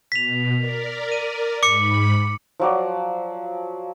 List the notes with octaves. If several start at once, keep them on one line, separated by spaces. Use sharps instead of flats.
B2 B6 F7
A#4 D5
D#7
G#2 B5 D6 C#7
F3 F#3 D5